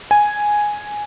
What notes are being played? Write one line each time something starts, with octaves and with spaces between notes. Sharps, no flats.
G#5